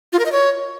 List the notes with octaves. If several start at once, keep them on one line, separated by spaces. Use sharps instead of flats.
F4
A#4
D#5
C#5